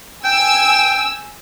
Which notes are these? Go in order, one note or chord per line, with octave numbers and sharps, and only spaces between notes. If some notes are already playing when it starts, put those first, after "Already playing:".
G5 G#5 E6